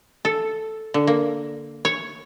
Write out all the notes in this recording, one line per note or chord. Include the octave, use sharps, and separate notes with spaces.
A4
D3
A#3
C#5